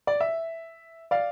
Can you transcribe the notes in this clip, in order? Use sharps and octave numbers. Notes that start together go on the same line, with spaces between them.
D5
E5
D5 F5